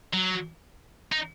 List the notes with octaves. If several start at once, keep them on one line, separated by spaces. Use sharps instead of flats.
F#3
D#4